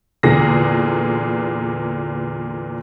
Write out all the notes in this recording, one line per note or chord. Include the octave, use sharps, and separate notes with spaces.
E2 A#2 D3 G#4 A#6